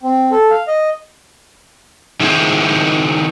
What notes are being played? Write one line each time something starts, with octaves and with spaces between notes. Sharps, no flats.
C4
A4
F5
D#5
D#3 E4 G#4 C5